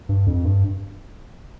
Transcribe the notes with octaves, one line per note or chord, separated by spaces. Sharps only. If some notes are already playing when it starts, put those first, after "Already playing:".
G2
F2
G2